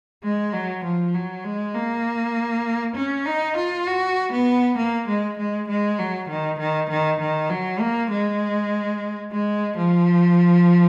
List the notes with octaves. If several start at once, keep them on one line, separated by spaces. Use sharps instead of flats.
G#3
F#3
F3
F#3
G#3
A#3
C#4
D#4
F4
F#4
B3
A#3
G#3
G#3
G#3
F#3
D#3
D#3
D#3
D#3
F#3
A#3
G#3
G#3
F3